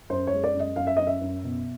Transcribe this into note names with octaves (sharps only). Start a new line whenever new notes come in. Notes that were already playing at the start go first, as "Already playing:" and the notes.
F#2 C5
C#5
G#3
D5
F#2
D#5
F#2 F5
E5
F#2 D#5
E5
F#2
B2